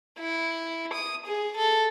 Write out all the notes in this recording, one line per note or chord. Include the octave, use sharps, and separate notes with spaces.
E4
D#6
G#4
A4